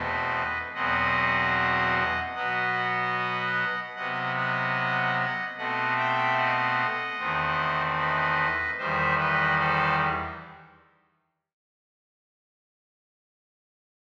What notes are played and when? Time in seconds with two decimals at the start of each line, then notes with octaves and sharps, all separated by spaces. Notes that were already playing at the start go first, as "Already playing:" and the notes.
Already playing: E2 B2 A3 C4 B4 D#5
0.74 E2 B2 F#3 C4 D#5 F#5
2.35 B2 F#3 B3 D#5 F#5
3.96 C3 F#3 B3 D#5 F#5
4.36 D#5 F#5
5.57 B2 A3 C4 D#5 F#5
5.97 E5 G5
6.37 D#5 F#5
7.18 E2 D#3 A3 C4
7.98 B4 D#5
8.79 E2 D#3 G3 C5 E5
9.19 B4 D#5
9.59 A4 C5